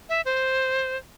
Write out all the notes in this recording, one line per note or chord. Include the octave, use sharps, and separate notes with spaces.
E5
C5